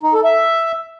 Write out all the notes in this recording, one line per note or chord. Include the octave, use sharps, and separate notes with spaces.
D#4
A4
E5